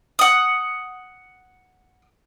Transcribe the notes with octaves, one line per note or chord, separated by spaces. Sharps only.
F#5 D#6